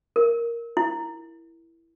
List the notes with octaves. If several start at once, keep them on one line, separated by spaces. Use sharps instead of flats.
A#4
E4